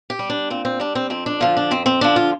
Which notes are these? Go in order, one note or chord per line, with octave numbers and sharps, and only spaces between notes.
G4
G3
D4
A#2 C4
C4
G3 D4
C4
F2 C4
D4
D3 F3 F4
D4
F2 C4
C4
D3 F3 D4
F4